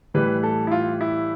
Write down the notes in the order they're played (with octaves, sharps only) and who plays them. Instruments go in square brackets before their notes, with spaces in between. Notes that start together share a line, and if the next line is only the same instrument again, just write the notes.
[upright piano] A2 E3 G3 B4
A4
E4
F4
E4